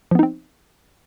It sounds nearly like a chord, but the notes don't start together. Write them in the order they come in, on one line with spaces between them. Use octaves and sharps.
F3 B3 D#4 C4